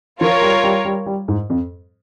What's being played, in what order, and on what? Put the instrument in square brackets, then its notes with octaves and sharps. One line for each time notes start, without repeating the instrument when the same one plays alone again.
[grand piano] F3 [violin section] F4 A#4 C#5
[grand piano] G3
G3
G3
G3
G#2
F2